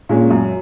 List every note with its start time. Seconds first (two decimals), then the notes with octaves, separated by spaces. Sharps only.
0.09 A#2 G#3 C#4
0.30 F#2